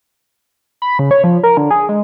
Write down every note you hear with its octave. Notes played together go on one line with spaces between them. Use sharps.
B5
C#3
C#5
F3
A#4
D3
G#4
G#3